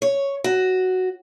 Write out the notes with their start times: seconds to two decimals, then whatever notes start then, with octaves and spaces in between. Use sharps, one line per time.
0.02 C#5
0.44 F#4